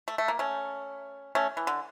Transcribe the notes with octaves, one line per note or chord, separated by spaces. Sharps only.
A3
A3
A#3
A3 C#4
A3 C#4
E3
D3